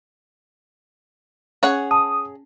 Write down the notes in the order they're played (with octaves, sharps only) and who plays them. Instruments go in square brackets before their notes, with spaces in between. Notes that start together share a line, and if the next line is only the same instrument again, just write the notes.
[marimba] C#4 [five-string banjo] G#4 C#5 F#5
[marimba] A5 [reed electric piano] D#6